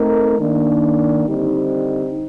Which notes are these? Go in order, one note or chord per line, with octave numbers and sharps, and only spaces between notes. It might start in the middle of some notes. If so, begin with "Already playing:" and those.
Already playing: A3 C4 D#4 A#4
D#3 A#3 D4
D3 G3 C4 D#4